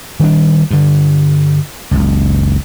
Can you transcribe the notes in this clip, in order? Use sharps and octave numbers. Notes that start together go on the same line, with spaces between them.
D#3 G3 B3 D4
G2 D3
F#1 C#2